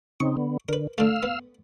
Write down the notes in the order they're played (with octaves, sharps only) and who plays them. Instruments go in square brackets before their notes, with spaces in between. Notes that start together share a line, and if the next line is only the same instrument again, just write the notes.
[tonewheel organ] C#3 C4 D#4 [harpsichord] C#6
[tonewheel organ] D3 B3
[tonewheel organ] D3 [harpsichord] A#4 B4
[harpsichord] D3 A3 [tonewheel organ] F5 E6 F6
[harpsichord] B3